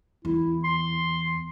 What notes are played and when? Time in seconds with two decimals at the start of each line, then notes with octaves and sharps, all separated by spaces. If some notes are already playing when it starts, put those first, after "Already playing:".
0.25 E2 E4
0.64 C6